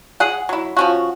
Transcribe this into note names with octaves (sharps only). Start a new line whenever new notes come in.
G#4 F#5
F#3 E4
F3 C#4 F#4